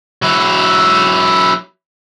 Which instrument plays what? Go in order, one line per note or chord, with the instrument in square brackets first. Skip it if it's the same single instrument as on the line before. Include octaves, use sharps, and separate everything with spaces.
[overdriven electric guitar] F#3 E4